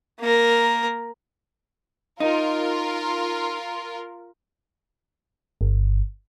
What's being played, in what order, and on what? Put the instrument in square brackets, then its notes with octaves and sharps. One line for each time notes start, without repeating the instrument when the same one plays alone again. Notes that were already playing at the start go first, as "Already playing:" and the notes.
[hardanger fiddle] A#3 A#4
[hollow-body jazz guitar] D#4 [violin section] F4 A#4
[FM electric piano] G1